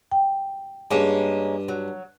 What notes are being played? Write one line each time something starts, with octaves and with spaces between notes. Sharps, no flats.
G5
G2 G#3 A#3 C#4
F#3